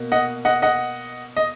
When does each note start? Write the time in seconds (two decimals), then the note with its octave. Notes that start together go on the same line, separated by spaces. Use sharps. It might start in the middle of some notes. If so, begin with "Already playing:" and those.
Already playing: B2 A#3
0.12 D#5 F#5
0.45 D#5 F#5
0.62 D#5 F#5
1.36 D#5